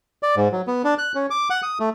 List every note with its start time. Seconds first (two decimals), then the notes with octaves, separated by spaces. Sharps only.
0.23 D5
0.36 G#2
0.52 F#3
0.67 B3
0.84 D4
0.98 F#6
1.15 C#4
1.30 D6
1.50 F#5
1.63 D#6
1.80 A3